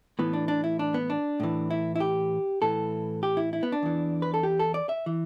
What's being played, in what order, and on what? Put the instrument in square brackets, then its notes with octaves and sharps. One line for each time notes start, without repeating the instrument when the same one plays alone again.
[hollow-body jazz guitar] A2 E3 B3
D4
D4
E4
D4
B3
D4
A2 E3
E4
E4
G4
A2 E3 A4
G4
E4
E4
B3
D4
E2 E3
B4
A4
G4
A4
D5
E5
E3